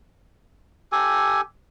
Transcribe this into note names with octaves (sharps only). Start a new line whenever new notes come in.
G4 A4 G#5